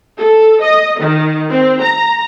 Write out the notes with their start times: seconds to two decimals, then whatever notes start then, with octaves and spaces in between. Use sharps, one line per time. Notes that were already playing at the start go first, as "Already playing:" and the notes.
0.18 A4
0.62 D#5
1.00 D#3
1.50 C4
1.81 A#5